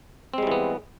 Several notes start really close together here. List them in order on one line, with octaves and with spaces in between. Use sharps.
C4 G#3 G3 E3 B3